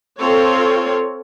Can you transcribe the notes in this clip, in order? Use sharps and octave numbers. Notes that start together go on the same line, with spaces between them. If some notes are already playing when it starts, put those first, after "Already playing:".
C4 F4 A4 C#5